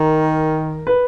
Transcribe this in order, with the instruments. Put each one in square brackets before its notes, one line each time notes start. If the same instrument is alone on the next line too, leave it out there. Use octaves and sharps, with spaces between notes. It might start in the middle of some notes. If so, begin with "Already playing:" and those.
Already playing: [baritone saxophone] D#3 [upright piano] A#4
[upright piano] B4